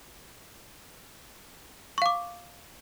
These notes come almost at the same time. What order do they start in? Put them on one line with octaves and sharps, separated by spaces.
C#6 F5 D6